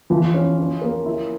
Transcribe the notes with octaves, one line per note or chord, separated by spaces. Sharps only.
E3 F3
C#4
C#4
A#3
E4